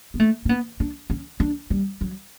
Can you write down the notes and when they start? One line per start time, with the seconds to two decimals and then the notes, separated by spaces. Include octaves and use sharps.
0.14 B3
0.20 A3
0.45 C#4
0.49 B3
0.80 D4
1.10 C#4
1.40 D4
1.70 G3
2.01 F#3